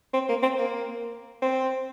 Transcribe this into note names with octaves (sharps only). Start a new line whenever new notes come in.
C4
A#3
C4
A#3
C4